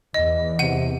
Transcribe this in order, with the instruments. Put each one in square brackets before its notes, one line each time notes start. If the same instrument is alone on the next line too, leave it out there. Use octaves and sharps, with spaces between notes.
[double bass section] E2 [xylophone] D#5
[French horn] C3 [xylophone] F#5 D#7